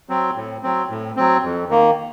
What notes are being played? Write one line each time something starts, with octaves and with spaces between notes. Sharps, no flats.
F#3 C4
A2
F#3 C4
A2
F#3 C4
F2
D#3 A#3